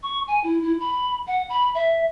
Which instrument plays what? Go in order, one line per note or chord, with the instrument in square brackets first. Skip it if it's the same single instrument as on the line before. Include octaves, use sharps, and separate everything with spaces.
[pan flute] C#6
G#5
E4
E4
B5
F#5
B5
E5